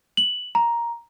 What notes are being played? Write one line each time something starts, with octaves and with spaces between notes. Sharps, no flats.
F#7
A#5